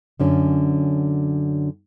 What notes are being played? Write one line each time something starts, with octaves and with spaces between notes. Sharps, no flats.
F#2 D3 C#4